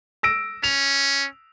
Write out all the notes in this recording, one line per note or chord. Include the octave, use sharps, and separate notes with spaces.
E6 A#6 D7
C#4 F7